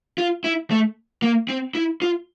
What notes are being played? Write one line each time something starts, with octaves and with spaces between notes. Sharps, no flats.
F4
E4
A3
A#3
C4
E4
F4